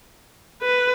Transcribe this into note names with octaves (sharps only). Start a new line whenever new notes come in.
B4